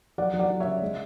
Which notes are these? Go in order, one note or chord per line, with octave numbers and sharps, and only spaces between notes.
F#3 D5 F#5
F#3
D5 F#5
F#3
C#5 E5
C#3
G#3